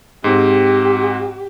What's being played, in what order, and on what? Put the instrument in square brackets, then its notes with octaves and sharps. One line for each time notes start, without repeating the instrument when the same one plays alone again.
[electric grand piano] G#2 C4 [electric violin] G4